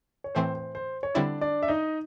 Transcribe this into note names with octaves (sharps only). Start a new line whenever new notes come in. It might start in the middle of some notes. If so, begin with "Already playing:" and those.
C#5
A2 E3 A3 C4 C5
C5
C5
C#5
D3 G3 C4 D4 E4 D5
D4 D5
E5
D#4 D#5